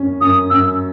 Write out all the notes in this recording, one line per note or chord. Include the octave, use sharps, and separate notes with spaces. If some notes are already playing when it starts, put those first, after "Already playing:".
Already playing: F#2 C#4
F#2 D#6
F#2 E6